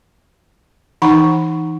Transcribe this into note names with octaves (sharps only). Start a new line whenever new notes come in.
E3 D#4 F#5 A#5 B5 C#6